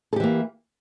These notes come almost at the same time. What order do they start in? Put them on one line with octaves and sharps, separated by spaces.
A4 G4 E3 A#3